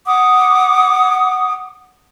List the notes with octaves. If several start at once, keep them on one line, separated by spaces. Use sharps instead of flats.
F#5 D6 D#6